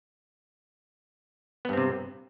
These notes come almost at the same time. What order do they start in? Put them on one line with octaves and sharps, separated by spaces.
B3 G2 C4 C3